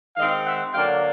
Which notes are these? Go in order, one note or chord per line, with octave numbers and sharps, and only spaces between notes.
D#3 G#3 C4 D#4 D#5 F5
E5 F#5
D3 F#3 A#3 D4 F5 G5